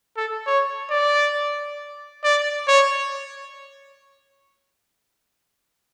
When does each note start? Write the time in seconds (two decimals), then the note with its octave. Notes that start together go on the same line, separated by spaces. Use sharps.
0.17 A4
0.47 C#5
0.91 D5
2.24 D5
2.68 C#5